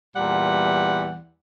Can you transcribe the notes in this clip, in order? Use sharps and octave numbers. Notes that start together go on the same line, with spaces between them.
E2 A#2 E3 G3 F#5